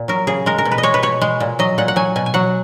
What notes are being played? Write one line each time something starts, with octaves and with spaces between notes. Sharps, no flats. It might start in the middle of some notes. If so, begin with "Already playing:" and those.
Already playing: A#2
F#3 A#4
C#3 G#4
G#3 A#4
A#4
B2
B4
D#5
G#3 C#5
B4
B2 C#5
G#3
A#2
F#3 D#5
A#2 F#5
F#5
F#3 G#5
B2 G#5
G#5
F#3 F#5